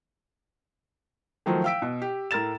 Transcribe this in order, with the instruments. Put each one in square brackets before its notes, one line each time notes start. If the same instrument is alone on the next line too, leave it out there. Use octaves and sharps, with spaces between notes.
[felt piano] D#3 F3 F#3 A3 C5
F5 G5 E6 B6 D7
B2
G4
A2 A#4 A#5 A6 E7